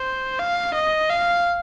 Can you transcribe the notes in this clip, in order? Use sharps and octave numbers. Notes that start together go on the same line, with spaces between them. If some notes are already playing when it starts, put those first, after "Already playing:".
Already playing: C5
F5
D#5
F5